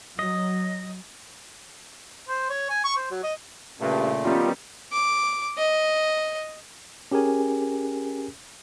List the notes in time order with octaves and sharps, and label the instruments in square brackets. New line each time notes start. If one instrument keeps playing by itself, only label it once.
[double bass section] F#3 [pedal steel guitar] D#5
[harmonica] C5
C#5
G#5
C#6
C5
F#3
D#5
[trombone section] G2 [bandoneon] A#2 A3 [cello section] C#3
[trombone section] D#3 G3 [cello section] F3 B3 C#4 [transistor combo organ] F4
[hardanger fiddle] D6
D#5
[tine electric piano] C#4 G4 G#4 A#4 G#5